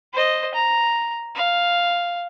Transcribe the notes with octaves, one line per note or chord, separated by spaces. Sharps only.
C5 D#5
A#5
F5